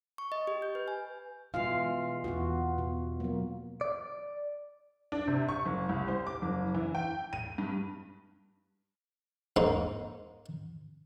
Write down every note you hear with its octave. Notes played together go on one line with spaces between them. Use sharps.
C#6
D#5
G4
G6
B4
G#5
B2 E3 G#3 F4 F5
E2 B3 F4 F#4
B2
F#3 A#3
D5
D4
C3
C#6
F#1
C2
C5
D6
F#1
E3
G5
D#7
G2
G#2 A#3 D#4 C6